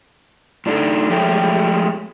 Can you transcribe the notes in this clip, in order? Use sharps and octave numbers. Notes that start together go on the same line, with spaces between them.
A2 D4 D#4 A4
F3 G#3 A3 G4 C#5